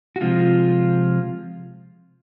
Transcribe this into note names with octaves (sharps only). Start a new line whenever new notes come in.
F#4
C3 F3 G#3 F4